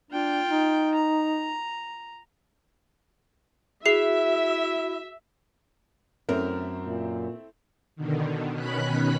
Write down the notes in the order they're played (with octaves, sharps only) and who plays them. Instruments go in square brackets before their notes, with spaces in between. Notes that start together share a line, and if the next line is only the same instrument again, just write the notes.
[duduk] D4 [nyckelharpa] F4 G5
[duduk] D#4
[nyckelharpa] A#5
[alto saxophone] E4 [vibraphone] F#4 [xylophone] G#4 C7 [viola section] E5
[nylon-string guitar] F#2 A#4 [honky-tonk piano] A3 C4 E4
[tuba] A#2
[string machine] B2 D3 D#3
B2 D#3 C#4 B5 F#6 B6